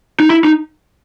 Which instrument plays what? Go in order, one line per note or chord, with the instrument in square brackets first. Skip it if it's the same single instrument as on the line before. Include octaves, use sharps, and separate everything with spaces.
[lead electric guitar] D#4
E4
D#4